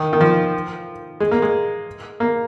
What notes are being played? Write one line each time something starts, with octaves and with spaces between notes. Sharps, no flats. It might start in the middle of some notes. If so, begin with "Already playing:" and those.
Already playing: D#3
D#3
F3
G#3
A#3
G#3
A#3